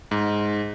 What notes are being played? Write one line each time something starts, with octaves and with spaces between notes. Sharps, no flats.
G#2